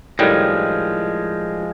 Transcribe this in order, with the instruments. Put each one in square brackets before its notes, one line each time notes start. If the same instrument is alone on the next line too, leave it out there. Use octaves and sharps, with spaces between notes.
[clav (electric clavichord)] A2 D#3 G3 [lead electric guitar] F3 G#3